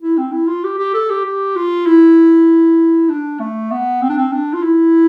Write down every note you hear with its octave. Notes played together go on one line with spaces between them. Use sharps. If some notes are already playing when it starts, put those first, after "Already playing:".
E4
C4
E4
F4
G4
G4
A4
G4
G4
F4
E4
D4
A3
B3
C4
D4
C4
D4
F4
E4